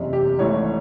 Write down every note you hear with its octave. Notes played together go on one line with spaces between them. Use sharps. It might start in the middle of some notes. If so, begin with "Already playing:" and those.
Already playing: F#1 E2 C3
G4
G#1 G#2 E3 A3 C#5